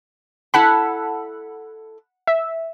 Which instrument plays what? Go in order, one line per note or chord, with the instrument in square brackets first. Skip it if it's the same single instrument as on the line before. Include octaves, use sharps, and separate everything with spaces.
[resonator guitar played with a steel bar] E4 A4 A5 [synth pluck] F#5 B5
[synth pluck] E5